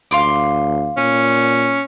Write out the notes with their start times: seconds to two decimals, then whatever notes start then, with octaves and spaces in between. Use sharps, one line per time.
0.11 D2 F5 C6 D6
0.97 A#2 C#4